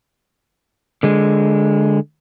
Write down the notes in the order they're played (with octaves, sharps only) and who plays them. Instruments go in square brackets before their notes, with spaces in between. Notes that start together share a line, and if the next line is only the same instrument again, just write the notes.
[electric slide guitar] D3 G#3